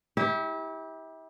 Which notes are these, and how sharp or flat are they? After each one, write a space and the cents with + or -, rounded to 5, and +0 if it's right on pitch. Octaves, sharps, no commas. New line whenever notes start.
E4 -35 G4 +15